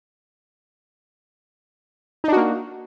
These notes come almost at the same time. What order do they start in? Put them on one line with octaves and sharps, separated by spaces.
D#4 D4 F#4 A#3